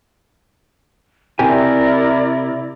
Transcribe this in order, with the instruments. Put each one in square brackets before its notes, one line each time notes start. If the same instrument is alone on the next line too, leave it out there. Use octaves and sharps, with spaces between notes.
[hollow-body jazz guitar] C3 G4 G#5 [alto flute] E4 [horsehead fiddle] A#4 D5